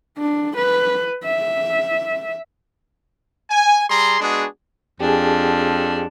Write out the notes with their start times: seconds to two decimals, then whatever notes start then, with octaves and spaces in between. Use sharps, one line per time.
0.18 D4
0.57 B4
1.25 E5
3.51 G#5
3.89 G3 G#4 A#5 C6
4.20 G#3 B3 D4 F#4 G#4
5.00 F2 D4 G4 G#4